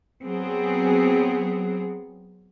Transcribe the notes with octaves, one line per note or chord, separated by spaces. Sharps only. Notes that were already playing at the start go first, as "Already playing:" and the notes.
F#3 B3 C4 G#4